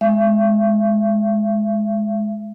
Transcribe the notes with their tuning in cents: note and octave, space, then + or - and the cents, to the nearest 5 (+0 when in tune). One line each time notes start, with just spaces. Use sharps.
G#3 +15 E5 +35